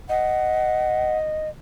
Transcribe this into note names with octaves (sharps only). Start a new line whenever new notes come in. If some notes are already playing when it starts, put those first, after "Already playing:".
D#5 F#5